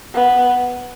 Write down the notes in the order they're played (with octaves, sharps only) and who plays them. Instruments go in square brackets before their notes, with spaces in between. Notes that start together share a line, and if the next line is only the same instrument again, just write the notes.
[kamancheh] B3